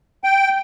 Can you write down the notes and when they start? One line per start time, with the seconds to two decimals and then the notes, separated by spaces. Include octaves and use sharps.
0.24 G5